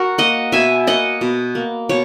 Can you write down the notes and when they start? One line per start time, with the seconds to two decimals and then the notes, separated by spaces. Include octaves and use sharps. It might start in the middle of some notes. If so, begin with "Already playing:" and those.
Already playing: F#4 A#4
0.18 A#3 D#5 F#5
0.52 B2 E5 G#5
0.87 A#3 D#5 F#5
1.21 B2
1.55 A#3
1.89 B2 C#5